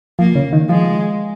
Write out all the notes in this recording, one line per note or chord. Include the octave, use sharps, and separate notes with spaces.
F3 A#3
C#3
D#3
F3 G#3